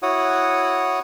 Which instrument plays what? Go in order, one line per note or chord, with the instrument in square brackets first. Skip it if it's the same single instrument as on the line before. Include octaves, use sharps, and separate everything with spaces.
[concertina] E4 F#4 C#5 F#5 D#6